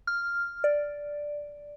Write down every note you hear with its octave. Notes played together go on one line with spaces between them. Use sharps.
F6
D5